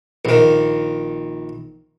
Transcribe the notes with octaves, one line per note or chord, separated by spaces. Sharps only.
A#1 D#3